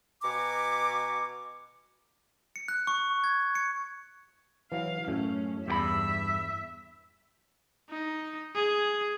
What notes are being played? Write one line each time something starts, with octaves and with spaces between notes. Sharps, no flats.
B2 G#5 A#5 C#6 D6
C#7
F#6
C#6
G#6
C#7
E3 F#3 F5
F#2 A2 A3 C#4
E2 G2 G4 E5 B5
D#4
G#4